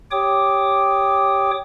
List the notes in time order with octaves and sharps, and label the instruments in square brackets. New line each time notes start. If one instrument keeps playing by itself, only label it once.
[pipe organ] G4 C#5 G5 D6 D#6